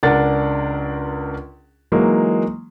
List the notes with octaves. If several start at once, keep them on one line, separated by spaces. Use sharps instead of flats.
C#2 D4 A#4 F#5 A6
E3 F#3 G#3 A#3 D#4